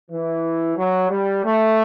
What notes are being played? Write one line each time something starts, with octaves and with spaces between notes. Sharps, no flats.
E3
F#3
G3
A3